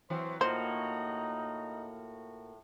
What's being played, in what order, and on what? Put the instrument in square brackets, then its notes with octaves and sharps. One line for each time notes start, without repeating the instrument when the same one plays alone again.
[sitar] E3 F#3 C4 [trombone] C5
[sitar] A2 F4 [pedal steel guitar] A#3 F#4 [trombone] D#4 [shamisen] C5